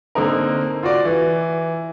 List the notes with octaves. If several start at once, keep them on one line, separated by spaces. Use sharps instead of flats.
D3 A#3 C4 D#4 A#4
F4 F#4 D5
E3